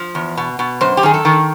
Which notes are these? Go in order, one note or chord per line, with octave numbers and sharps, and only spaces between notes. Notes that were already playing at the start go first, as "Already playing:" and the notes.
Already playing: F3
E2
B2
B2
F#2 C5
G4
D#3 G#4
A4
D#3